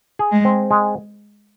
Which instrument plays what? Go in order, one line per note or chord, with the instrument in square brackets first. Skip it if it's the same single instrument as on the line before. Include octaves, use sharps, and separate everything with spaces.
[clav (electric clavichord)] G#4
[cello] G#3
[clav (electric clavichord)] C4
G#3